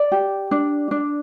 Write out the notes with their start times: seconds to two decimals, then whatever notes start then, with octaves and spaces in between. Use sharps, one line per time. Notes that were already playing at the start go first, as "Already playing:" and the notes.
Already playing: D5
0.12 G4
0.51 D4
0.91 D4